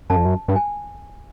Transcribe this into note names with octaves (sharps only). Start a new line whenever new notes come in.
F#2 A5
F2
F#2
G2
G#5